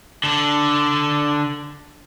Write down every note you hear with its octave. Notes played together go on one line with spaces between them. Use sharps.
D3 A4